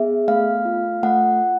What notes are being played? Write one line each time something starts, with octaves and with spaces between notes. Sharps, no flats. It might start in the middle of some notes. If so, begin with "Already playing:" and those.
Already playing: B3 G#4 E5
A3 F5
F4
A3 F#5